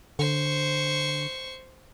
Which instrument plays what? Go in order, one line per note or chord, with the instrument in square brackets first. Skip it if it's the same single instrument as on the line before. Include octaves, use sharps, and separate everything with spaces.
[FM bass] D3 [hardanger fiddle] C5 C#6